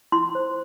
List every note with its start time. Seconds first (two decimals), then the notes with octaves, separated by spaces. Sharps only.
0.12 E4 C6
0.35 C5